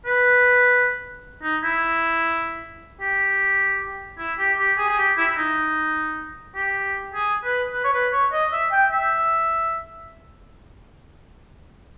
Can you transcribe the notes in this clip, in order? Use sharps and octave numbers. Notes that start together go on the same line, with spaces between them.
B4
D#4
E4
G4
E4
G4
G4
G#4
G#4
G4
E4
E4
D#4
G4
G#4
B4
B4
C#5
B4
C#5
D#5
E5
G5
E5